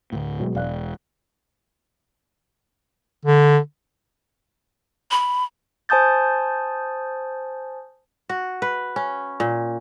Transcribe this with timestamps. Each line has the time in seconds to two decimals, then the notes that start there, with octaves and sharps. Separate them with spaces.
0.12 D2 A2
0.39 B2 F#3 G#3
0.55 E1 D5 F5 F#6
3.25 D3
5.11 B5
5.89 C5 G#5 A5 D#6 G6 A6
8.29 F#4
8.62 B4
8.96 C#4
9.40 A#2